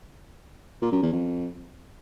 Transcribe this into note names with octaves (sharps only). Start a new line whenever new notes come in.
A#2
F#2
E2
F2